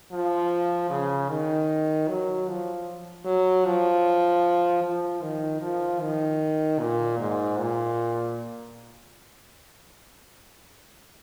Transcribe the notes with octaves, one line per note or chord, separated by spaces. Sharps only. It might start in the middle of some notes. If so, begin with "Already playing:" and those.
F3
C#3
D#3
F#3
F3
F#3
F3
F3
D#3
F3
D#3
A#2
G#2
A#2